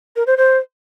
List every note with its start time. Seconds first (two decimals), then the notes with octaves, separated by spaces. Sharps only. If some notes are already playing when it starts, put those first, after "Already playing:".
0.16 A#4
0.27 C5
0.37 C5